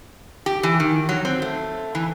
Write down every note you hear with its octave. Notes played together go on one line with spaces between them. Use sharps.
G4
E3
D#3
F#3
C4
A3
E3